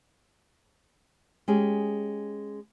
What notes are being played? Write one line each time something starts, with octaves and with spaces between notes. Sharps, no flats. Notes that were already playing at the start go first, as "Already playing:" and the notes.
G#3 C#4 G4 G#4